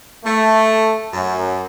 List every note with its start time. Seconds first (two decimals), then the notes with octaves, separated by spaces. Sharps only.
0.24 A3
1.13 F#2